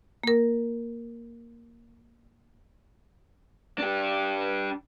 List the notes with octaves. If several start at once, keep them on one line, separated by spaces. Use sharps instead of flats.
A#3 A#4
D4 G4